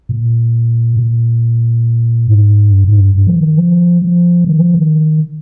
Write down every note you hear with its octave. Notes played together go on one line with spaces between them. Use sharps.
A#2
A#2
G#2
G2
G#2
G2
G2
F3
D#3
F3
F3
D#3
F3
D#3